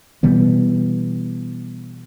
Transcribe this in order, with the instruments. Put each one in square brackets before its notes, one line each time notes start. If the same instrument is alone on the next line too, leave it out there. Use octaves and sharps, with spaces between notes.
[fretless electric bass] B2 E3 G3 B3